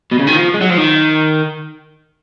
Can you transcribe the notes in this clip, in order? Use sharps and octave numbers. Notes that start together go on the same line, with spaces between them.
B2
C#3
D#3
F3
G#3
F#3
F3
D#3